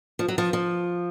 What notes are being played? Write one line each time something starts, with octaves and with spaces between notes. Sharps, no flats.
F3
F#3
F3
F3